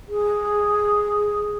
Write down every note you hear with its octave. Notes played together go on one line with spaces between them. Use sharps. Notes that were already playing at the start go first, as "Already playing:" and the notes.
G#4